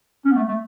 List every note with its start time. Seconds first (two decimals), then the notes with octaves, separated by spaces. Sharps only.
0.25 C#4
0.31 B3
0.36 A3
0.48 A3